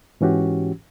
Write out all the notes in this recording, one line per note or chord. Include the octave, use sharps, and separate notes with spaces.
G#2 E3 C#4 F#4 G4